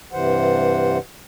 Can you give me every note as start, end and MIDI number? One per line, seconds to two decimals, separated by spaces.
0.13 0.98 43
0.13 0.98 48
0.13 0.98 52
0.13 0.98 72
0.13 0.98 78